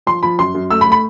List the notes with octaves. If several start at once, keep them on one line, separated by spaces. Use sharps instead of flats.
F3 C6
F3 B5
F#2 C6
F#2
A3 E6
B5
A3
B5